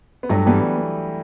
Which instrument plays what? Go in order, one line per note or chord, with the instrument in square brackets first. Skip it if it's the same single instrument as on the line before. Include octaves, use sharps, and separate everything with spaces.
[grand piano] B3
[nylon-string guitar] G2 [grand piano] F#3 A3
[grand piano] E3 G3 [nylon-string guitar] B3